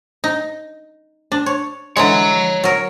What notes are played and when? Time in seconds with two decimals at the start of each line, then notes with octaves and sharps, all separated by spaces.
0.24 D#4
1.32 D4
1.46 C#5
1.97 D3 E3 G#3 C#5 A#5
2.64 F#3 A#4